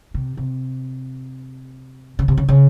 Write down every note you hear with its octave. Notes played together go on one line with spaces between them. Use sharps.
C3
C3
C#3
C3
C#3
C#3